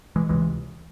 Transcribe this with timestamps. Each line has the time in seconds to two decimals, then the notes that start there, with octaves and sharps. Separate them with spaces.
0.16 E3 G#3
0.29 C#2 C3 E3 G#3